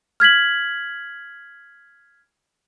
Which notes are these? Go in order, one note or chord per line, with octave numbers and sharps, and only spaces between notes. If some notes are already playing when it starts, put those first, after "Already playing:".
F6 G#6 B6 F#7